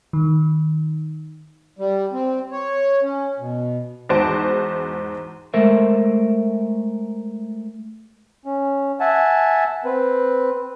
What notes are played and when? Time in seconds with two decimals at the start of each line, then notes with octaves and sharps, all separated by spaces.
0.13 D#3
1.79 G3
2.13 C4
2.52 C#5
3.03 C#4
3.39 B2
4.09 E2 G#2 F#4 C5 A5 D7
5.54 G#3 A3 A#4 C5 E5
8.46 C#4
9.00 E5 F#5 G#5 A5
9.85 C4 B4